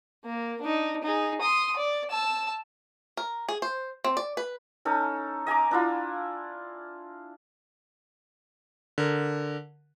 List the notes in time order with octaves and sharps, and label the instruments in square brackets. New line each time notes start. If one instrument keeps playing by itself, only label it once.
[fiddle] A#3
D4 D#4
D#4 G#4
C6 D#6
D5
A5 E6
[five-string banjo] A#4
G#4
C5
C4
D5
B4
[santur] C#4 D#4 A4
D#5 G#5 A#5 D6
D4 E4 F4
[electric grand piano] D3 A#4